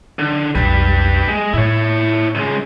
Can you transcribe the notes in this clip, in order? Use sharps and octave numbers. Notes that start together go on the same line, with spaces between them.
D3
B1 F2 G4 B4
G#3
A2 E4 C#5
C#2 G#3